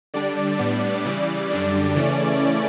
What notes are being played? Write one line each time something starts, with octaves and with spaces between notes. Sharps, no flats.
D3 G3 D4 D5
A2 G3 B3 D4 D5
C#3 E3 G3 D5
F#2 D3 G3 D4
C#3 E3 A3 C#4